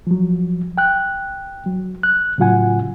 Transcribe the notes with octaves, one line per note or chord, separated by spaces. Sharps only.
F3 F#3
G5 F#6
F#3
F#6
A2 C#3 F#3 F4 F#5 G#5